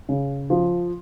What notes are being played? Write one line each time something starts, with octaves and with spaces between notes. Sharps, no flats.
C#3
F3